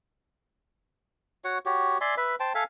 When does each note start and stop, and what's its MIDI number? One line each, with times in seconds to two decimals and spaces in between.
1.44 1.58 66
1.44 1.58 73
1.44 1.58 78
1.66 1.98 66
1.66 1.98 67
1.66 1.98 73
2.01 2.15 74
2.01 2.15 76
2.01 2.15 80
2.01 2.15 84
2.17 2.35 71
2.17 2.35 76
2.40 2.53 72
2.40 2.53 79
2.40 2.53 81
2.55 2.64 69
2.55 2.64 76
2.55 2.64 77
2.55 2.64 80